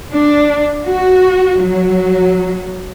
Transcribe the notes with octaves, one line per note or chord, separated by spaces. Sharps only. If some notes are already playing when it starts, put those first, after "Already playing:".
D4
F#4
F#3